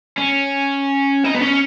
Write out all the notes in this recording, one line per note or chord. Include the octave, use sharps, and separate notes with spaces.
C#4
D#4
B3
C#4